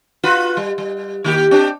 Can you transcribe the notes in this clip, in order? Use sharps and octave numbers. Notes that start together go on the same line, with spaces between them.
F4 F#4 B4
G3
G3
D#3 A#3 G4
C4 D4 G4